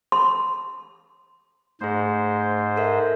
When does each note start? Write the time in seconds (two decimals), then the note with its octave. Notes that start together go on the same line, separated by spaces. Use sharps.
0.12 C6
1.81 G#2 A3 G#4 C5
2.77 A4 A#4 E5